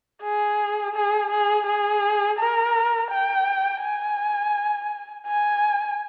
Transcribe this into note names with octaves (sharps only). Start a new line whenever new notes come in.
G#4
G#4
G#4
G#4
A#4
G5
G#5
G#5